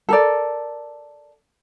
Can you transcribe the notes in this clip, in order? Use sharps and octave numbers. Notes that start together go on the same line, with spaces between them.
A4 A#4 D5